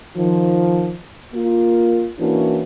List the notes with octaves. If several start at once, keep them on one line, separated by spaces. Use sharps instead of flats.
D#3 F3
A#3 F4
E3 A#3 C#4 D4 E4 F#4